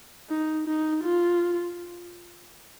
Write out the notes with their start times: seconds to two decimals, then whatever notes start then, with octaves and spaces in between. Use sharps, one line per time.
0.29 D#4
0.67 D#4
1.04 F4